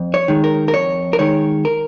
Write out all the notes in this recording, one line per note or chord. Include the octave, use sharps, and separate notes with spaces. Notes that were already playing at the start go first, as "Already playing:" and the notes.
Already playing: F2
C#5
D#3 G#3
A#4
A#4
F2 C#5
A#4
D#3 G#3 C#5
A#4